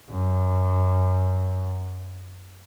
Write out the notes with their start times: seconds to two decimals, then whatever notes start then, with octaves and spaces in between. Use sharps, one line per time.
0.10 F#2